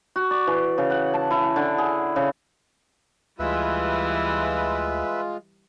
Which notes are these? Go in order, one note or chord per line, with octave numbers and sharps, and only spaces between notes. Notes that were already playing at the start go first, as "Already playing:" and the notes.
F#4
D5
E3
C#3
F#5
A5
E4
D3
G#4
C#3
D2 E3 G3 G#3 F4 B4 E5